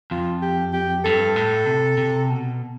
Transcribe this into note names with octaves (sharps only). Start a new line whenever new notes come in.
F2 F4
G4
G4
G2 A4
A2
C3
C3
B2